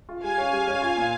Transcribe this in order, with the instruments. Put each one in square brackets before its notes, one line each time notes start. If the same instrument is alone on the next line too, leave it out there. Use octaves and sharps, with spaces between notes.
[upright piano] F4
[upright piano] G3 [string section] F5 G#5
[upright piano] C#4
G3
C#4
F4
A#2